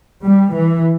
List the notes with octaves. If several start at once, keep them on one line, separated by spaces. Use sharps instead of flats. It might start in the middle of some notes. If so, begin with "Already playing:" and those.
G3
E3